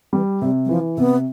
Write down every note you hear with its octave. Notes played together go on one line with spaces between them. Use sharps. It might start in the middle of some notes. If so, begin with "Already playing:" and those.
E3 G3
C3 G3
G3
E3 F3
C3 B3